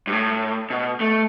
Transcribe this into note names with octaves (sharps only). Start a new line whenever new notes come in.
G2
A2
B2
A3